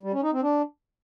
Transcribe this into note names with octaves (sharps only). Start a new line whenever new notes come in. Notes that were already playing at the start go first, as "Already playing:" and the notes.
G3
C#4
D#4
C4
D4